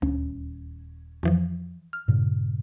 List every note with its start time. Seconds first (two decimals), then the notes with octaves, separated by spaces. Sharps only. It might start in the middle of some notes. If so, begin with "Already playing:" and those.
0.02 D#1 D2 C#4
1.23 F2 E3 F3
1.93 F6
2.08 G2 A#2 C#3